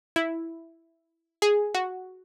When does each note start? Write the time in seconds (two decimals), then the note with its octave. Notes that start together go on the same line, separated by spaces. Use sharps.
0.16 E4
1.42 G#4
1.75 F#4